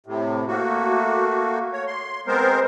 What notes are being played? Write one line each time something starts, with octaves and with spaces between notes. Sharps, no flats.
A2 C3
A3 A#3 F#4
C#5
C6
G#3 B3 C4 A#4 C5